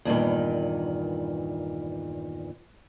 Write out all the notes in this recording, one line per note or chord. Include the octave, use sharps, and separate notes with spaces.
E2 G2 A#2 D#3